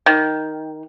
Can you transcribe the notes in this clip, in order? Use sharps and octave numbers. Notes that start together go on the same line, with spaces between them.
D#3